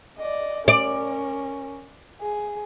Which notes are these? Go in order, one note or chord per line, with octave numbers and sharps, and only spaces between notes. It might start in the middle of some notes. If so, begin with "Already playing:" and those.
D5 D#5
C#4 A#4 D5
G#4